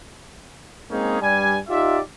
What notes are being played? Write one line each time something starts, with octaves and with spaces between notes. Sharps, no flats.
G#3 A#3 C4 C#4 D#4 G#4
G2 G3 D5 G#5
D#4 F4 G4 D5 E5